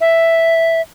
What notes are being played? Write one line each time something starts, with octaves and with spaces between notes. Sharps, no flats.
E5